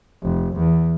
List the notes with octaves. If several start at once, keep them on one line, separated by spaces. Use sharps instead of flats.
F1
E2